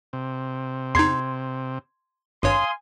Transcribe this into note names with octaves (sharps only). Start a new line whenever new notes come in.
C3
E2 D#4 C6 G#6
G#1 G2 C#5 F5 G#5 C6 D#6